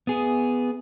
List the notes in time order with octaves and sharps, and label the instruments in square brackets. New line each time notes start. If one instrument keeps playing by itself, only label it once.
[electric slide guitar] B3 G#4